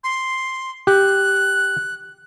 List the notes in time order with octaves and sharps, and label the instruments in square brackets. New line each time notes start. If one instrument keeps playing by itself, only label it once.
[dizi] C6
[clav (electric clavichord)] G4 [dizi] F#6